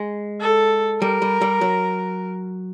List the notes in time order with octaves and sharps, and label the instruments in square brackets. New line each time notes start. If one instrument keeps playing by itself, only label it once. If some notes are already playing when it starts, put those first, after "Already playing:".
Already playing: [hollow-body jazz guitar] G#3
[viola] A4
[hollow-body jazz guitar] G3 [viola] A#4
[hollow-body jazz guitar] G3
G3
F#3